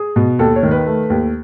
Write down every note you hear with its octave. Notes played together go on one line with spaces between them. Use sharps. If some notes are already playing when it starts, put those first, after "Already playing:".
Already playing: G#4
B2
D#2 A4
C#5
D#3
B4
A3
D#2